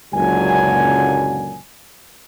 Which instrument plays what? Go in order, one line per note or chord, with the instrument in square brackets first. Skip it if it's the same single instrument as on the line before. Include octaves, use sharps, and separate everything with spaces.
[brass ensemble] F#1 C#2 A#2 D3 F#3 G#5